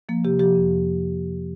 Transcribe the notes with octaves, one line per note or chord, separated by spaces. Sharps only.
F3 A#3
C3 G4
F3 G4
F2